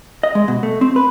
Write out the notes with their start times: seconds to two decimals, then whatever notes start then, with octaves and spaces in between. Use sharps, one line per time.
0.23 D#5
0.35 G#3
0.48 B2
0.63 A3
0.81 C4
0.96 B4